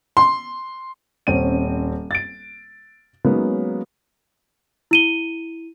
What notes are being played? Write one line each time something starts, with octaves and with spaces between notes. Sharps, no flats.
C6
D#1 C4 C#4 D#7
A6 D7
F#3 G#3 A#3 B3 C#4 D#4
E4 D#7 G7